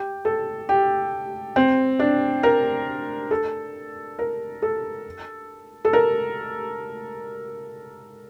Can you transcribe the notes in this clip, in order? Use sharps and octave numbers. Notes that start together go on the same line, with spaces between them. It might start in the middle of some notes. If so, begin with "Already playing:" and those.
Already playing: G4
A4
G4
C4
D4
A#4
A4
A#4
A4
A4
A#4